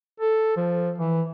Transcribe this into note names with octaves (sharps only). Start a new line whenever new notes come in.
A4
F3
E3